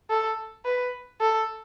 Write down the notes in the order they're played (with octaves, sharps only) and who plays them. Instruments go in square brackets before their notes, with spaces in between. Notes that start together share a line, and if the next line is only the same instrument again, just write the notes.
[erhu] A4
B4
A4